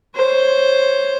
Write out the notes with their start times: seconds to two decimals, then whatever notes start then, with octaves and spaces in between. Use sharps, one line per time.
0.16 C5 C#5